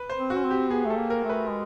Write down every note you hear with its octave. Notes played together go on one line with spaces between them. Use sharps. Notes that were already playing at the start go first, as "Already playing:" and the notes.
Already playing: B4
C5
C4
F#4
C#4
C4
G4
B3 G#4
A3
A4
A#3
A#4
A3
B4
G#3